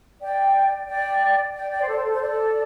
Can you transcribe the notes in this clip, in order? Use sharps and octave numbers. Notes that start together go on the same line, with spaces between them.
D5 G5
D5 G5
D5 G5
D5 G5
C5
A4 D5
C5
A4
C5
A4 D5